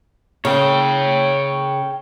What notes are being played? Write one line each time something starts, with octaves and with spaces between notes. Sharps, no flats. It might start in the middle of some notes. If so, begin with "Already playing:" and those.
C#3 C#5 G5